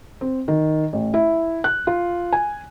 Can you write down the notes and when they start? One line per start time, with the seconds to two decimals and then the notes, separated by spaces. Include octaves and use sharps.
0.21 C4
0.48 D#3
0.93 A1
1.14 E4
1.64 F#6
1.87 F4
2.33 G#5